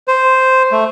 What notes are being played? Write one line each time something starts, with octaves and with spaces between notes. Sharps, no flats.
C5
A3